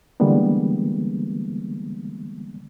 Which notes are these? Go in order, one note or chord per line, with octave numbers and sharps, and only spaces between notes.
D3 E3 G3 G#3 A#3 B3